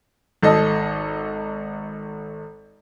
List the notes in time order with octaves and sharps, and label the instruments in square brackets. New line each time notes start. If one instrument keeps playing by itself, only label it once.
[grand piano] G#1 A4 D#5